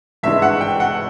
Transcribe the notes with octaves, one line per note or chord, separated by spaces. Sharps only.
G#1 G2 E3 G#3 E5
F#5
G5
F#5